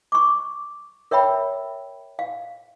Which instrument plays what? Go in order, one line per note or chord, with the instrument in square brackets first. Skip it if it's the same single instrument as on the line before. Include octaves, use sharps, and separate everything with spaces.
[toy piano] C#6 D6
A#4 C#5 E5 G5 B5
F5